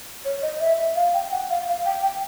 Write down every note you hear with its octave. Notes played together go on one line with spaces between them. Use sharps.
C#5
D#5
E5
F5
G5
F#5
F5
F5
G5
G5